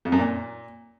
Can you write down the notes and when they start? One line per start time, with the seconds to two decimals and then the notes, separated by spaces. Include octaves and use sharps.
0.05 F2
0.12 F#2
0.19 A#2